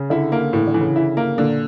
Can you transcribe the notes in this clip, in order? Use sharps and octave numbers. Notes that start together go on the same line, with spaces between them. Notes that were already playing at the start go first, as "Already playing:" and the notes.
Already playing: C#3
D3 E4
A#3
A2 E3
D3
E3
C#3
E4
A#3
A#2 D3